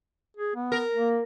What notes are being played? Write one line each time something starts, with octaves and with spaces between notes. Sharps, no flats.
G#4
B3
A#4
A#3